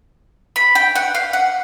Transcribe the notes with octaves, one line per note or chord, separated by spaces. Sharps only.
B5
G5
F#5
F5
F#5